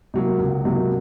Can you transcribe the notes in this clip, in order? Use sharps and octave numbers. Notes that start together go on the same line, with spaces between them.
C3 F#3 A#3
C#2
C3 F#3 A#3